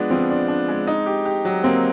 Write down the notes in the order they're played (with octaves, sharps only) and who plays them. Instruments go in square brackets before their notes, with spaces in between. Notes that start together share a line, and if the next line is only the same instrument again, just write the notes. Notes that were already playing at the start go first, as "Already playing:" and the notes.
Already playing: [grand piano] F3 G#3 B3 D4
[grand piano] F3 [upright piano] C4
[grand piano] D4
D4
G#3
D#4
G4
G4
F#3
[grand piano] A#3 [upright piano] C4